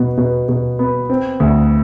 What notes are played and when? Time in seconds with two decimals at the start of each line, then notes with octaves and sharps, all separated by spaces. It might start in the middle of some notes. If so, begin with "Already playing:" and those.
Already playing: B2 B3
0.18 B2
0.48 B2
0.79 B3
1.10 C4
1.40 D2